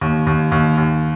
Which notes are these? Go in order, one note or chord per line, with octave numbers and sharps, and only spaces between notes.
D#2
D#2
D#2
D#2